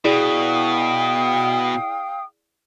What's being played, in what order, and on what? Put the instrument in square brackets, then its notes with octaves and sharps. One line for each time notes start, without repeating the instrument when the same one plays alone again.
[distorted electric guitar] B2 [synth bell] E4 G#4 D5 [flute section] F5 G5 D#6